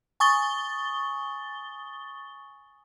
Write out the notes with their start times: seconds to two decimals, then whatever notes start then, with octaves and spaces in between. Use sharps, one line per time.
0.20 G#5 C#6 D#6 A6 G7